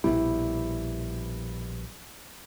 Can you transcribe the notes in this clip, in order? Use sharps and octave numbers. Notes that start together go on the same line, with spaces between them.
A#1 B2 G3 E4